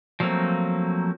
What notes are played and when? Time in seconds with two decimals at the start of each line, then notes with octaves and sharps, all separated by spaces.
0.20 F3 F#3 A3 A#3 C4